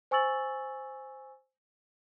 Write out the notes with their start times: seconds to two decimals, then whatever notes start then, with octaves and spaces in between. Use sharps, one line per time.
0.11 C5 G#5 C#6 E6 A6 F#7